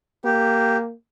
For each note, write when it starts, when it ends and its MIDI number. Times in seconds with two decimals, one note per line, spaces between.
0.25 0.93 58
0.25 0.77 67